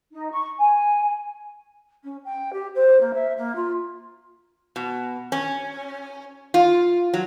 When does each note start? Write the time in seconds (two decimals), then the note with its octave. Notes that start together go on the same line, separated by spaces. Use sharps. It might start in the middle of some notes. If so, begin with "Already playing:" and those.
0.12 D#4
0.31 C#6
0.58 G#5
2.03 C#4
2.24 G5
2.53 G4
2.75 C5
3.00 A#3
3.14 E5
3.37 A#3
3.55 F4
4.76 B2
5.32 C#4
6.54 F4
7.14 F#3